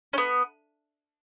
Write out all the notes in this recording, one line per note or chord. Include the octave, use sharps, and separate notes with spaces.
C#4
B3